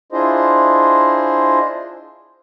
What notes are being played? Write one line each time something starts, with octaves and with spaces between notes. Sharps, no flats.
D4 E4 F4 G#4 C5 D#5